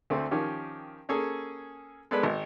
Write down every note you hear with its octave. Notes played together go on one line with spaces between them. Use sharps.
D2 A3 C4
D#3 F3 C#4 G4
A#3 C#4 G#4 A4
G#3 B3 A4 B4 D5 B5
G#1